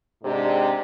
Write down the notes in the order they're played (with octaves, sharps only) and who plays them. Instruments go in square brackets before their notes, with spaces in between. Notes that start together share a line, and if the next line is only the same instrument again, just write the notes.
[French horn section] G#2 C3 D4 G4